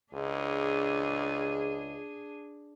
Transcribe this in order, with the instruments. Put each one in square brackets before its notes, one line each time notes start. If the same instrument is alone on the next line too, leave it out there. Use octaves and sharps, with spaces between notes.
[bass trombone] C#2 [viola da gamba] D4 G#4